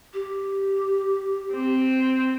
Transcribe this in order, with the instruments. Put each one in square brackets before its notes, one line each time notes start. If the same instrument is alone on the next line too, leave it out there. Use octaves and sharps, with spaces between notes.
[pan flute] G4
[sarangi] C4